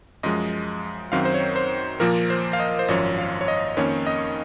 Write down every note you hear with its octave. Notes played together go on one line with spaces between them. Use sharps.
F#2 F3 G#3 D#5
F#2 D#3 F#3 C4 F5
C5
C#5
C5
A#2 F3 A#3 A#4
C5
F5
D#5
C5
G#1 F#2 F3 C#5
F5
C#5
D#5
F2 D#3 A#3 C#4 C#5
D#5